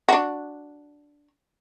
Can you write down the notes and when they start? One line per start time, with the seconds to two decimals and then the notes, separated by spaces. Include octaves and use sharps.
0.09 D4 F#4